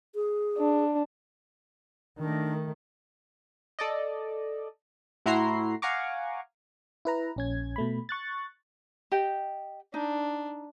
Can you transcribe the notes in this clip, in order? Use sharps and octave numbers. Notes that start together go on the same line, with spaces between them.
G#4
D4
D#3 A3 D4 D#4 A#4
A4 D5 D#5
A2 E4 F#4 A#5 C6 C7
F5 F#5 G#5 A#5 C#6 D6
E4 B4 A#5
A#1 C#4 G#6
B2 A3 B5
C#6 F#6 A6
G4 D#5 G5
D4 D#4